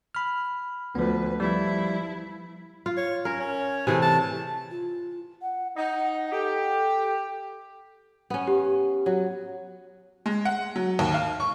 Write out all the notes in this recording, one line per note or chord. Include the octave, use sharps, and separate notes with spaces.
B5 F6
D2 F3 B3 B4
F3 G3 E4
F4
C#5
C#4 A#4
C#4
C3 E3 A3 G#4
A5
F4
F#5
D#4 F#5
G4 A4
B3 C#4
G4
F#3
G#3
F#5
F#3
D#2
F5
C#6